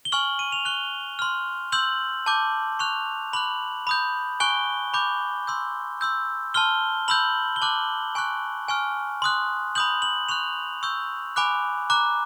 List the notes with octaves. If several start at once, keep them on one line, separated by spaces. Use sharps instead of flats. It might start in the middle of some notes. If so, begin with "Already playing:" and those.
G7
G#5 C#6 F6 F#7
D#7
F7
C#6 F#6 G7
C6 F6
C6 E6 G6 F#7
A5 D6 G6
C#6 F#6 F7
B5 D6 F#6 F#7
B5 D#6 G6
G#5 C#6 F#6 G7
B5 D6 G6
C6 E6 G6
C6 E6 G6
A5 C6 F6 G7
B5 E6 G6 F#7
G7
A5 D6 F#6 F#7
G#5 C#6 F#6
G#5 C#6 F6
C6 D#6 F#6
B5 D#6 G6 F#7
F#7
C#6 F#6 F7
C#6 E6 G6
G#5 B5 D6 F#6
A#5 D6 F#6